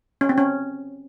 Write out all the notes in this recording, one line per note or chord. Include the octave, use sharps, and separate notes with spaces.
C#4
C4
C#4